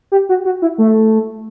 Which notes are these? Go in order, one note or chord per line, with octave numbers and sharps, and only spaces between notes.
G4
F#4
F#4
E4
A3